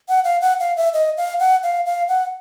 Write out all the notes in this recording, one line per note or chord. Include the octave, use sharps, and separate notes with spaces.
F#5
F5
F#5
F5
E5
D#5
F5
F#5
F5
F5
F#5